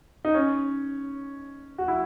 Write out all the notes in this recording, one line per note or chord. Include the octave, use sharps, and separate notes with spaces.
D#4
C#4
F#4
E4